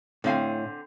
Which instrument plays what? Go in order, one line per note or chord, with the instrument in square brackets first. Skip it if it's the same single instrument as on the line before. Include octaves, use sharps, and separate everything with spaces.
[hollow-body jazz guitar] A2 F5 [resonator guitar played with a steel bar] D3 C4 G#5